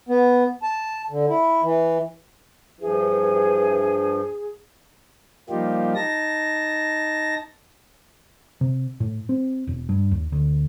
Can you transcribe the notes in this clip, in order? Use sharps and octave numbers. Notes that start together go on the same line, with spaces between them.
B3
A5
D3
E4
E3
G2 E3 F3 G#4
F3 G3 A#3 D#4 F4 G4
D#4 A5 A#6
C3
A2
C4
E1
G2
D#2
D2